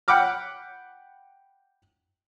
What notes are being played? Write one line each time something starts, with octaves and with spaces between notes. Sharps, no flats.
F#5 G5 B5 D6 F6